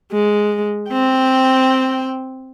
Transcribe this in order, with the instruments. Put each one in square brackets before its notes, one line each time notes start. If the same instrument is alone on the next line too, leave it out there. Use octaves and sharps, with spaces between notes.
[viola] G#3
C4 G5